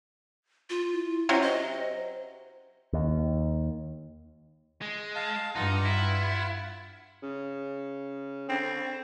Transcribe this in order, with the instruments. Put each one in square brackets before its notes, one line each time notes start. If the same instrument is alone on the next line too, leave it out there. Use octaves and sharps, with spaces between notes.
[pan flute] F4
[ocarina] E4
[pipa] C3 F#3 [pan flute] C#4
[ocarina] C5 [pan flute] D#5
[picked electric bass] D#2
[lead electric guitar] G#3
[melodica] F5 A5
[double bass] G2 [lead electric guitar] D#4 [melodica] F4 F#5
[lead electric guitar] E4
[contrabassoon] C#3
[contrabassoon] D3 [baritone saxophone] C4